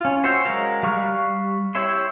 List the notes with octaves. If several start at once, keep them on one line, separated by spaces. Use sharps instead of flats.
C#4 F4
F#4 C5 C#5 E5 G5
F#3 G#3 A#4 F5
G3 F5 C#6 F6 F#6
E4 G4 C#5 E5 C6